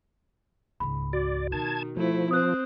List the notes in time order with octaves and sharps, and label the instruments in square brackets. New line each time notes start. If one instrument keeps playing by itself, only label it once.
[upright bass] C#2 G#2 [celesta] B5
[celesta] F#4 [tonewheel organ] D5
[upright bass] B2 [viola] D#3 [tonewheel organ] A5 G#6
[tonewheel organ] F3 [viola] A3 E4
[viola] C4 C5 [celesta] D#6 F#6